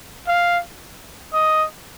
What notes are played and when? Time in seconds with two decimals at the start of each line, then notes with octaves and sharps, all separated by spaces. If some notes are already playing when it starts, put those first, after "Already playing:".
0.28 F5
1.34 D#5